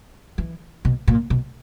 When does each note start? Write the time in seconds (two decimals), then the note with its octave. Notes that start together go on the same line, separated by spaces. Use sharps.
0.38 E3
0.85 B2
1.08 A#2
1.30 B2